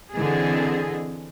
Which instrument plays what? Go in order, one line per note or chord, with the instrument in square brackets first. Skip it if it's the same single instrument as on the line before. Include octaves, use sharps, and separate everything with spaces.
[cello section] D3 E3 C4 G#4 D#5